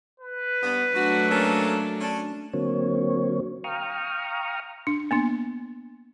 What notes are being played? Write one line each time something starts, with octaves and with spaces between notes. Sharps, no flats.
B4
G2 B3
F#3 A3 D4 F#4
A#3 C#4 A4
C#4 D4
D3 F#3 A#3 C4 C#5
F5 G5 A#5 C#6 D#6 F6
D4
A#3 B3 D4